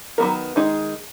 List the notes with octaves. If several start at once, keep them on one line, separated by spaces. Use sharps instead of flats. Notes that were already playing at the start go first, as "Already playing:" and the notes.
D#3 F#3 B3 F#4 A#4
D#3 G#3 D#4 G#4